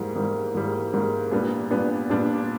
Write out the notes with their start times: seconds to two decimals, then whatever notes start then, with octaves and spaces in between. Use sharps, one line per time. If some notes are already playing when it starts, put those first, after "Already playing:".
Already playing: G#2 E3 G3 A#3
0.15 G#2 E3 G3 A#3
0.54 G#2 E3 G3 A#3
0.93 G#2 E3 G3 A#3
1.31 A#2 G3 B3 D4
1.71 A#2 G3 B3 D4
2.10 A#2 G3 B3 D4